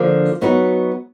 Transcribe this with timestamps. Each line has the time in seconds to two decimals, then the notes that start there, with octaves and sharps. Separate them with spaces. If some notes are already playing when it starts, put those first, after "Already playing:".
Already playing: D3 F3 A#3 D4
0.41 F#3 B3 D#4 F#4 B4